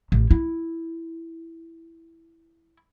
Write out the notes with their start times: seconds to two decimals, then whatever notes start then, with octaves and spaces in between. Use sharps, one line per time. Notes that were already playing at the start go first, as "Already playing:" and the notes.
0.12 A1
0.31 E4